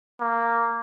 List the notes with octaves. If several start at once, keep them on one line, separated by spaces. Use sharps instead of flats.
A#3